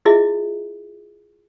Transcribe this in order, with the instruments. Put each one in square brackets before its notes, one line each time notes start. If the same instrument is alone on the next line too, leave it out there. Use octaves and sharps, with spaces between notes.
[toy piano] E4 F4 G#4 D#5 E5